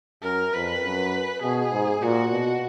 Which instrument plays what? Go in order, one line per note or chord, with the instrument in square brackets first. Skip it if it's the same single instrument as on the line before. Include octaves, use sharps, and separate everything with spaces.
[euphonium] F#2 [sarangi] A#4
[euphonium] F2 [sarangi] B4
[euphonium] F#2
[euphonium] B2 [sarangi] G#4
[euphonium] G#2
[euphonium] A#2 [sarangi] F#4
[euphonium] B2